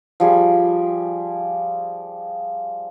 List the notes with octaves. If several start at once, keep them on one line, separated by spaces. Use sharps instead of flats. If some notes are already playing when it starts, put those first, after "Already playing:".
F3 G3 G#4